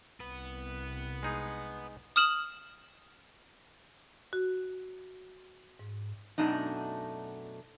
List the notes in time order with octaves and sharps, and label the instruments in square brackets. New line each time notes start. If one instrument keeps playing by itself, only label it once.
[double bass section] C2 [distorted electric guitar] B3 B4
[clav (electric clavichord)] G#3 D#4 G#4
[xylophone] D#6 F6 E7 F#7
[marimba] F#4
G#2
[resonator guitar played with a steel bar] F#2 B2 A3 D4 D#4